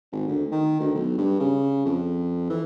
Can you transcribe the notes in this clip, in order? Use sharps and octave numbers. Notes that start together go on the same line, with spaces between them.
G#1
D2
D#3
D2
B1
G2
C#3
F2
E3